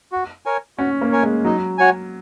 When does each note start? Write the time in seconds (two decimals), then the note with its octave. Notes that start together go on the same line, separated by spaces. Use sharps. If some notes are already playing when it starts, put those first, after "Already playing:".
0.12 F#4
0.46 A#4 C#5 G#5
0.78 C#4 F#4
1.01 A#3
1.12 A#4 C#5 G#5
1.23 G#3
1.45 F#3 D#4
1.78 F#4 C#5 G#5